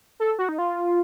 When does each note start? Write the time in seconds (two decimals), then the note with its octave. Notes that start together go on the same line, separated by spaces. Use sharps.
0.20 A4
0.39 F#4
0.49 D#4
0.58 F4